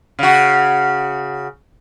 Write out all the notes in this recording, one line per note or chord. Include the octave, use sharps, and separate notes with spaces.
C#3 F#4